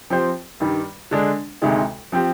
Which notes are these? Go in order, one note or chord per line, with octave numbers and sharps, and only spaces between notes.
F3 C4 G4 C5
G2 D#3 G3
D3 G#3 D4
D2 C3 D#3 G#3
F3 C4 G4